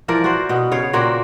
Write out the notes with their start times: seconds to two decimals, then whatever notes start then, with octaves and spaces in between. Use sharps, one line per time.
0.08 E3 F3 A#4 D5
0.24 F#4 C5
0.49 B2 B3
0.72 C#3 C#5 F5
0.93 A#2 A#3 C4 F#4